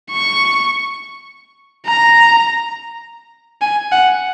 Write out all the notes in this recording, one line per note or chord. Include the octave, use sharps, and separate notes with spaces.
C#6
A#5
G#5
F#5